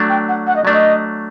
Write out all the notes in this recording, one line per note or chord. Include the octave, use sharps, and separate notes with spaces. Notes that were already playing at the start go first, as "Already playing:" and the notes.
Already playing: F#3 A3 D4
G5
F#5
F#5
D#5
F#3 A3 D4 D5
D#5